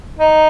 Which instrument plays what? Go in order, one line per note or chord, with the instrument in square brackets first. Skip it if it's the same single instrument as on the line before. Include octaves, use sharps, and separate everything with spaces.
[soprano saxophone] D#4